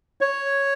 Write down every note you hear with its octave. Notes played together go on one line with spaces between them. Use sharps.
C#5